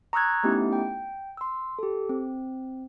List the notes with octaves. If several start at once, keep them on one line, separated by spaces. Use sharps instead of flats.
A#5 C#6 D#6 E6 F#6 G#6
A3 B3 C#4 D#4 E4 G4
G5
C6 E6
G4 A4
C4